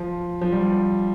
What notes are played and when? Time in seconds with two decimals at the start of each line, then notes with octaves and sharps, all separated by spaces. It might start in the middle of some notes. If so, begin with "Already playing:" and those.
Already playing: F3
0.41 F3
0.52 G3